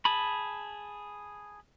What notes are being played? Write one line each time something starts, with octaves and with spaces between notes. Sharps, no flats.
G#4 A5 B5